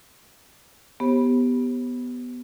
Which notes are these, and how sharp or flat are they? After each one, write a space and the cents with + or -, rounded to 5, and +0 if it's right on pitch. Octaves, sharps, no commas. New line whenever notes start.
B3 +0 G4 +0 C5 +45